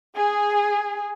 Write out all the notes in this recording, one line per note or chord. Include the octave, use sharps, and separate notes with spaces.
G#4